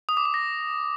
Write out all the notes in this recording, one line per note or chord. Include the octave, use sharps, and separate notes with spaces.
D#6
D6
D#6
A#6